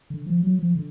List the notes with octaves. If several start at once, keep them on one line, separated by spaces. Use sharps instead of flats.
D3
F3
F#3
F3
D3